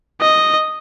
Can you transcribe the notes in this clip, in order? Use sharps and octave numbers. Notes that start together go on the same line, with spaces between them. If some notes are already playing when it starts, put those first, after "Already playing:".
D#5